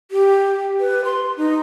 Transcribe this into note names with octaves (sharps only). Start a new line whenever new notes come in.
G4
B4
C6
D#4